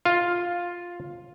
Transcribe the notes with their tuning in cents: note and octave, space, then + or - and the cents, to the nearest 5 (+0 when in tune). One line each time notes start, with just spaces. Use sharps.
F4 +5 F5 +0